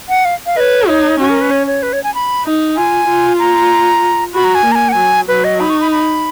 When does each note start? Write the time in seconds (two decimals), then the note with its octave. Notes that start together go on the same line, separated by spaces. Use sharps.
0.09 F#5
0.25 F5
0.46 F5
0.57 B4 C#5 D#5
0.88 D#4 C#5
1.20 C#4 F#4
1.30 A#4
1.41 B4
1.51 C#5
1.67 C#5
1.83 B4
1.93 C#5
2.04 G#5
2.14 B5
2.45 D#4
2.76 F4 G#5
3.08 F4
3.39 A#5
4.34 F#4 B5
4.44 A#5
4.55 G#5
4.66 A#3
4.72 A#5
4.75 G#5
4.89 F#5
4.92 F#3 G#5
5.28 F#3 B4
5.44 D#5
5.60 D#4 B5
5.70 C#6
5.81 B5
5.91 B5